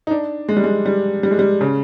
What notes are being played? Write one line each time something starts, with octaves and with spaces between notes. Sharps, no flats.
D#4
D4
G#3
G3
G#3
G3
G3
G#3
G3
C#3